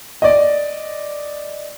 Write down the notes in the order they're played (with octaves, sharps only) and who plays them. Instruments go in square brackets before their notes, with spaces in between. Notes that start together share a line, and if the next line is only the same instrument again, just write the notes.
[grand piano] D5 D#5